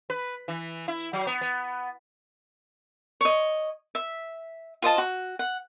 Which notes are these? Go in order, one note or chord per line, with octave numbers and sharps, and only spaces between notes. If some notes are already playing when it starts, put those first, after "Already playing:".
B4
E3
E4
F#3
B3
B3
C#5 D#5
E5
F4 C5 D#5 A5
F#4
F#5